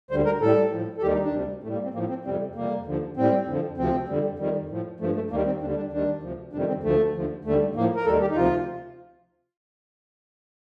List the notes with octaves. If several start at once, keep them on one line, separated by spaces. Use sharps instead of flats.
D2 D3 G3 C5
A#4
A2 G3 A4
A2 F3
A4
D#2 D#3 G3 G4
D#4
D4
D2 C3 G3
A2 G3 A3
A#3
C4
A2 F3 A#3
C4
F2 C3 G3 C4
F2 C3 G3 A#3
D#2 D3 F3
A2 G3 C4
F2 D3 F3
D2 C3 F3 C4
F2 D3 G3
F2 D#3 G3
A2 F3
G2 F3 A3
A3
D#2 D#3 G3 A#3
C4
D#2 D3 G3 D4
D4
D#2 D#3 G3 D4
D2 C3 F3
F2 C3 D#3 G3 D4
C4
D2 D3 F3 A3
D#2 D3 F3
D#2 D3 G3 A3
A2 F3 A#3
A#4
D#2 D#3 G3 A4
G4
D#4
D2 C3 F3 F4